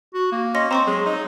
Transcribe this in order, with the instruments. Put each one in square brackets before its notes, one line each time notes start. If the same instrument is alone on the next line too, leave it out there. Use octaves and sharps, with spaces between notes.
[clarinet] F#4
A#3
[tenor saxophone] C#4 [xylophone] D#5 C6 A#6
[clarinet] C4 [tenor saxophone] C5 [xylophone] A#5 C6 C#6
[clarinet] F#3 [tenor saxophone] G#3
[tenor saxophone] D#4